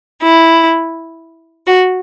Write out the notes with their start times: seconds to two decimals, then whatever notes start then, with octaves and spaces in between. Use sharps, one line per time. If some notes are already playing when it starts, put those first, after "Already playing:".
0.22 E4
1.66 F#4